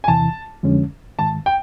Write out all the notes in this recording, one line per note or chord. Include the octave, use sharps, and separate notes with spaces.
G#5
E2 C3 E3 A5
F2 D3 F3 G#3 C#4
G#2 D#3 G#3 A5
G5